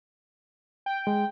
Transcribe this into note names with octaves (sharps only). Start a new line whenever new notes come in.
G5
G#3